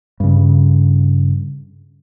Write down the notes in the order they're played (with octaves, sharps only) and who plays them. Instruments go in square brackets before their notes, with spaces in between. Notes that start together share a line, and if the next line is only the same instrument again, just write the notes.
[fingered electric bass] G2 C#3